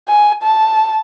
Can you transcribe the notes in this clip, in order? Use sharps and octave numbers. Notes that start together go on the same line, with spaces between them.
G#5
A5